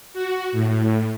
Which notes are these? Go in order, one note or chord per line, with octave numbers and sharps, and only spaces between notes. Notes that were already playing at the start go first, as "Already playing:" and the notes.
F#4
A2